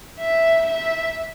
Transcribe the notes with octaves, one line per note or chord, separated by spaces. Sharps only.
E5
E5